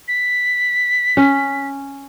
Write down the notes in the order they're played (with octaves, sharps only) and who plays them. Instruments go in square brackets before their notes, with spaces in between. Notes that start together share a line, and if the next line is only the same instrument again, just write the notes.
[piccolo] B6
[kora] C#4